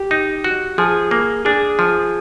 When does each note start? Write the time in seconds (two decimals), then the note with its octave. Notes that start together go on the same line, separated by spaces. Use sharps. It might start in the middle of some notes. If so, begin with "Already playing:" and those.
Already playing: G4
0.11 D#4
0.44 F#4
0.78 F3 G#4
1.11 A#3
1.45 D4 G#4
1.79 F3